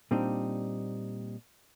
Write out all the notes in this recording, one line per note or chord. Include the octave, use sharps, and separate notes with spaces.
A#2 G3 C4 D4 D#4